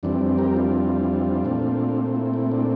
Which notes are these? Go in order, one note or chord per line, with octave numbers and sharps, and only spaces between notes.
F2 E3 G3 C4 D4
D4
G4 A#4
D4 F4
A#2 A3 C4
E4
E4
D4